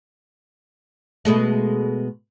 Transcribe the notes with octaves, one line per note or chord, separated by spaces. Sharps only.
B2 G#3 A3